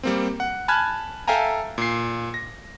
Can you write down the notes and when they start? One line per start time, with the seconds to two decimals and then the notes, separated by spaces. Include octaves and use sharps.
0.03 G3 A#3 C4
0.40 F#5
0.68 G#5 A5 B5 F6 F#6 G#6
1.28 A4 E5 F5 G5 G#5 A#5
1.78 A#2 C7
2.34 A#6